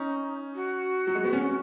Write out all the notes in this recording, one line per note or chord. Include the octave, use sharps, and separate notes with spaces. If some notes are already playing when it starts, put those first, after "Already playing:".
Already playing: C#4 D#4
F#4
F#3
G#3
B3
C#4